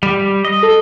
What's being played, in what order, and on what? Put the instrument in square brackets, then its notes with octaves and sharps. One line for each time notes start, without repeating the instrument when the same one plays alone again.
[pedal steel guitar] G3
D#5
[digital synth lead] A4